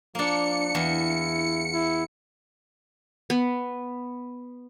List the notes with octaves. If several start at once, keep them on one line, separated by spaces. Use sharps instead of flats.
F3 A#3 D4 C#7
E2 E4
E4
B3